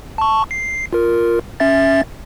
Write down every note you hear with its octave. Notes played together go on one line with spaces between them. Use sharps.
A5 C#6
C7
F4 A#4
C#4 E5 A6